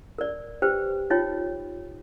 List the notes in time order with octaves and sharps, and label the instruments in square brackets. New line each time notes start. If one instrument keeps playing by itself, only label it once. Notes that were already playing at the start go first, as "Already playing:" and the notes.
[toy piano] A#4 D5
G4 B4 C5 G5
D#4 F4 C#5 G5